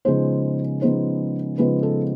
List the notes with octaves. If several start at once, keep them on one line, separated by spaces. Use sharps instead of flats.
C#3 F3 G#3 B3 D#4 C5
C#3 F3 G#3 B3 D#4 C5
C#3 F3 G#3 B3 D#4 B4
A4